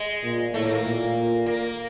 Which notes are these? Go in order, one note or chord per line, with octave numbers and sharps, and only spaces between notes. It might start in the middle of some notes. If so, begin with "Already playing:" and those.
Already playing: G#3
A#2
A2 A3
A#3
A#3
A#2
A#3